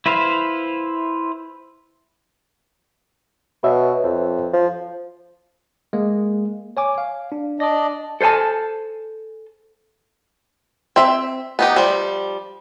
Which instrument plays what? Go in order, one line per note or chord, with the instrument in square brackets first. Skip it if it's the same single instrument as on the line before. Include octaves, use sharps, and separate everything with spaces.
[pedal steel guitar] E4 B4 C5 E5 F5
[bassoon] B2 [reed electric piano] B4 C#5 E5
[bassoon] F2
F3
[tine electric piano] G#3 A#3
C#5 G#5 D6
F5
D4
[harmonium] D4 D5 D#5 [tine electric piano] D6 A#6
[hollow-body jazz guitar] A4 C5 C#5 G#5 A5
[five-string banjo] C4 E5
B3 D#4 G4
F3 G3